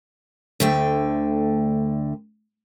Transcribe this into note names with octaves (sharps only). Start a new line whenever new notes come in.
D2 D3 A3 G5